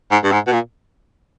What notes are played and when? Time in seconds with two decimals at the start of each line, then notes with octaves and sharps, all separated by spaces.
0.11 G#2
0.24 G2
0.32 G#2
0.47 B2
0.53 A#2